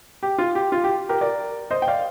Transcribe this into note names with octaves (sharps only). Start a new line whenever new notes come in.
G4
F4
G4
F4
G4
G4 A#4
A#4 D5
C5 D#5
G5
D5 F5